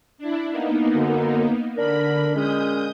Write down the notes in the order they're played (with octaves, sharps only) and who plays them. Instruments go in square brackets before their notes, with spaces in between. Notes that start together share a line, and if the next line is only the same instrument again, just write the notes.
[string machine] D4 E4
A#3 B3 D#4
[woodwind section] F#2 D3
[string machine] D3 B5 [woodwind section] D4 A#4
[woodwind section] A#2 G#3 C#4 [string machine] D#6 G6